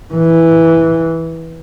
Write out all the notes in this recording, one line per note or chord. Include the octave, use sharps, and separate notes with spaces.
E3